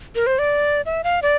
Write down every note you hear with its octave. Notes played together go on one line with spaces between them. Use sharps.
A#4
C5
D5
E5
F5
D5